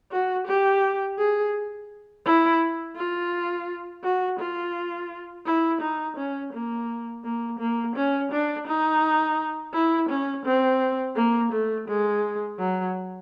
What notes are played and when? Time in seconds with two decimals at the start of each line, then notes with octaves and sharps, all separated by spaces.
0.12 F#4
0.47 G4
1.18 G#4
2.26 E4
2.96 F4
4.03 F#4
4.39 F4
5.46 E4
5.81 D#4
6.17 C#4
6.53 A#3
7.24 A#3
7.59 A#3
7.96 C#4
8.32 D4
8.67 D#4
9.74 E4
10.09 C#4
10.46 C4
11.16 A#3
11.52 A3
11.88 G#3
12.59 F#3